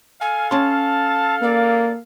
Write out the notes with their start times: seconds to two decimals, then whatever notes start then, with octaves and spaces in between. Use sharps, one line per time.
0.21 A4 F5 G#5
0.51 C#4 A5 C6
1.42 A#3 D5